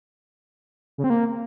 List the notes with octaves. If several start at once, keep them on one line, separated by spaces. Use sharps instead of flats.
C#3
C4
A#3